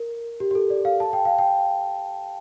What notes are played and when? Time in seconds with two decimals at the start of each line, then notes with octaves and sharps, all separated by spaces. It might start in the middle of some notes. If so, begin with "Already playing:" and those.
Already playing: A#4
0.40 G4
0.51 G4
0.55 A4
0.70 D5
0.85 F5
1.00 A5
1.13 G5
1.25 F5
1.39 G5